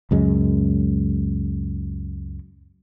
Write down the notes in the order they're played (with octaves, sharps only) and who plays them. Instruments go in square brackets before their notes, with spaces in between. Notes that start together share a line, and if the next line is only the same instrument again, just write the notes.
[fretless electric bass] C#2 F#2 G#3